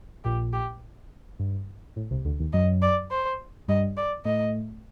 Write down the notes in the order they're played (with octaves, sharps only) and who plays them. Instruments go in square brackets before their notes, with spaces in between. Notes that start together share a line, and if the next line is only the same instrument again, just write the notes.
[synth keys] A#1 A#2 [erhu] G4
[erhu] G4
[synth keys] G2
A2
C2 C3
D2 D3
D#2 D#3
[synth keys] F#2 F#3 [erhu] D#5
[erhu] D5
C5
[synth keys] G2 G3 [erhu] D#5
[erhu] D5
[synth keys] A2 A3 [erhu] D#5